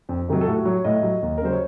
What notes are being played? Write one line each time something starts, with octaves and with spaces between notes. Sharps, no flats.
F2
C3 D#3 F#3
A4
A2 F#4
F#3 C#5
A2 D#5
F#3
D#2
A#4
C#3 F#3 C5
C#5